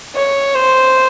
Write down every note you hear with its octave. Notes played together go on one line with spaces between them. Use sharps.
C#5
C5